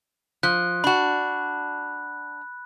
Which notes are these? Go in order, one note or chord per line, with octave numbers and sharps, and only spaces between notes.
F3 F#6
D4 F#4 B5 F#6